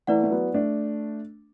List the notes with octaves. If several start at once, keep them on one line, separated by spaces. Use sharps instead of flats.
E3 A3 E4 B4 D5 F#5
A3
F#3 B3
A3 D4